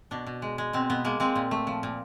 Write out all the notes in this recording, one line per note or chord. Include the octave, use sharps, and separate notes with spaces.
B2 D4
B2
G#3
G#3
B2 C4
B2 B3
G#3 A#3
G#3 C4
A#2
A3
F3
A#2